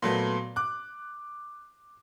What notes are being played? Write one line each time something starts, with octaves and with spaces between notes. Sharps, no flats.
A#2 F#3 A3 B3
D6 F#6